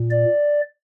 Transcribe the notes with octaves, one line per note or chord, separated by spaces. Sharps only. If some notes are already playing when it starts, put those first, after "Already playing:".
Already playing: A#2
D5